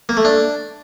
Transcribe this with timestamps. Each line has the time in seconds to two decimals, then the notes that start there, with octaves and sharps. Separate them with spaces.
0.09 A#3
0.17 A3
0.25 D4